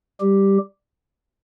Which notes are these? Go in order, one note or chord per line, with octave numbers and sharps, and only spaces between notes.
G3 G4